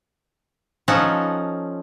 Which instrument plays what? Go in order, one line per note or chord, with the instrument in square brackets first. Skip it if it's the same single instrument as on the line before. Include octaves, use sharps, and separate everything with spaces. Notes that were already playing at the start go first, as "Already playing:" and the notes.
[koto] F3 C#4 D#4 A4 F#5